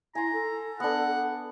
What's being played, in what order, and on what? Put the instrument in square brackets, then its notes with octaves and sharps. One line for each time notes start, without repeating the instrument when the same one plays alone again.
[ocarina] E4 [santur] G#5 C6 [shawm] A#5
[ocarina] A4
[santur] B3 D4 [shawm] F#5